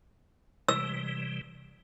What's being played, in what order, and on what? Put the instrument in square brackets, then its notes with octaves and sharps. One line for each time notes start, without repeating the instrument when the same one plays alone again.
[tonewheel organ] C3 E3 G3 [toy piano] E6